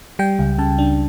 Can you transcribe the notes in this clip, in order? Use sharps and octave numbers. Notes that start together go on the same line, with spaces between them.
G3 G5
C#2
C#3 A5
D4